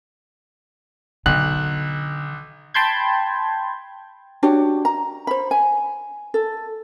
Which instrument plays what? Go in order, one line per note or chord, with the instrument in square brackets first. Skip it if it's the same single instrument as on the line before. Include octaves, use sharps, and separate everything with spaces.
[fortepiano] B1 [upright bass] D3 [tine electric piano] F#6
[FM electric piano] G5 A5 B5 C6 G6 G#6
[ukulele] D4 F#4 G4 C#5
A#5
C5 B5
G#5
A4